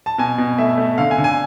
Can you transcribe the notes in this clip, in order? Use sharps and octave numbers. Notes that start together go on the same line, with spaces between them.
A5
B2 G#5
B2
A3 E5
A3
D3 F5
G#5
D3
G#5